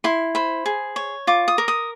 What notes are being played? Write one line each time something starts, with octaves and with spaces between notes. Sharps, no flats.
E4 C6
C5 B5
G#4
C#5
F4 D6
D#6
A#4
D#6